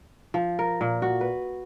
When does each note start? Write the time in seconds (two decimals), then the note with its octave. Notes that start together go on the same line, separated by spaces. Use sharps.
0.34 F3
0.59 A#4
0.81 A#2
1.02 F#4
1.21 B4